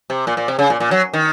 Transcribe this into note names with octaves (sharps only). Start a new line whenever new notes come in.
C3
A#2
A#2
C3
C#3
A#2
A#2
F#3
D#3